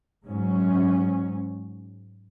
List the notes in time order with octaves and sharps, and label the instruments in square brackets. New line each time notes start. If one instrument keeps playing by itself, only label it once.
[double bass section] G#2 F#3 C#4